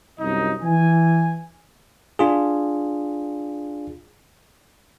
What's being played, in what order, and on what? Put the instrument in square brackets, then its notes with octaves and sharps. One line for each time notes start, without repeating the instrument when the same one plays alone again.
[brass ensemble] C2 F#2 D#4 D#5
E3 G#5
[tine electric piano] D4 F4 G#4